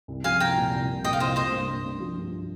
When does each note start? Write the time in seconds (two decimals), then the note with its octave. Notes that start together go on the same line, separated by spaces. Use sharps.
0.08 C2
0.24 F3 F5 G#5
0.40 C2 G5 A#5
0.56 A#2
0.72 C2
0.88 C2
1.04 A#2 D#5 G5
1.13 F5
1.20 C2 C5 D#5
1.36 A#3 C5 D#5
1.52 G2
1.69 A#3
1.84 G2
2.00 F3
2.17 G2